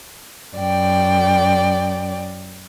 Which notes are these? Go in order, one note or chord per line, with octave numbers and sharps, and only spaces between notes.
F#2 D5 G5